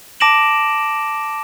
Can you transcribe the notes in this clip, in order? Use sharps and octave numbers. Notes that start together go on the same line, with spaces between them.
A5 D6 A#6 D7 E7 F#7